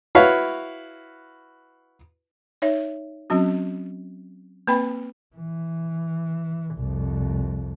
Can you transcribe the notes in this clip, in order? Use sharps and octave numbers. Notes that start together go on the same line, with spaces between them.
E4 F#4 B4 C#5 F5
D#4 C#5 E5
F#3 C4 C#4 F#4
A#3 C4 B4 G5 B5
E3
C2 F2